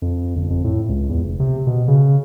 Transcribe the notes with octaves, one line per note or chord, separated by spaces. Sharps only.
F2
G1
F2
A2
C#2
E2
F1
C3
B2
C#3